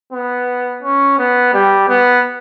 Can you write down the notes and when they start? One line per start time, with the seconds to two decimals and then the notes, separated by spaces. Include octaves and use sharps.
0.13 B3
0.83 C#4
1.19 B3
1.54 G3
1.89 B3